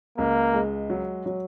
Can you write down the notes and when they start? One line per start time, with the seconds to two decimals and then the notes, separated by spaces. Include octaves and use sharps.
0.18 C#2 A#3
0.54 G#3
0.90 F#3
1.26 F#3